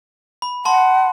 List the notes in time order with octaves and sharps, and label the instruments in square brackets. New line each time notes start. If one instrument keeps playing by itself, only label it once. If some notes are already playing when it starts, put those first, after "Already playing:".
[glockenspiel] B5
[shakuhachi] F#5 [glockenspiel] A5 C6